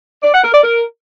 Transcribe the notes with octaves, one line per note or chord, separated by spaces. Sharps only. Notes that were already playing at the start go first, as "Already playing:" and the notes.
D5
F#5
A#4
D5
A#4